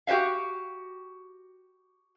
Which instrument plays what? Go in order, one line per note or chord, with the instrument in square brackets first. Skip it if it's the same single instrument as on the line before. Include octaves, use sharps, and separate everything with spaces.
[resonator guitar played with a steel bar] F#4 G4 C5 E5 F5